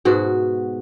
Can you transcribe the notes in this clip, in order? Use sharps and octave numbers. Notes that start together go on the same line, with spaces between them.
G#2 B2 F#4